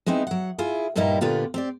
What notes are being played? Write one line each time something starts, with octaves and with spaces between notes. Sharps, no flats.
G#3 B3 C4 D#4 E4
F#3 F#5
E4 F4 G#4
G2 A#2 G3 A#3 D#4 E4
A#2 D3 B3 F4 G4
C4 G4 D5